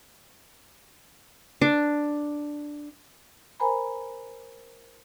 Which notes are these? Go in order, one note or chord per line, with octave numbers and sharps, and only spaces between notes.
D4
A#4 C5 G#5 A#5 B5